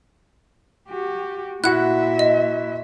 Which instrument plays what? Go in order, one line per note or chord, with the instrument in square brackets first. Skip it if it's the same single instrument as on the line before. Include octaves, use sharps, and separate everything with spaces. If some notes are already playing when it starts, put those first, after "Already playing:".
[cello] F#4 G4
[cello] A#2 E5 [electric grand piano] E4 F#4 [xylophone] F#5 F#6
[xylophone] D#5